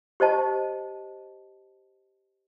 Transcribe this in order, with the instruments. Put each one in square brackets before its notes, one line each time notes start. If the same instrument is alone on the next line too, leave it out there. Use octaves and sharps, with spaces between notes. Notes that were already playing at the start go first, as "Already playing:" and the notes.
[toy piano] G4 C5 D#5 A5